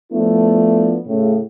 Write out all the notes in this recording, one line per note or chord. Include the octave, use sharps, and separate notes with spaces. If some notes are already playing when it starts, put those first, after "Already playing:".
F3 A3 B3 D4 E4
A2 C#3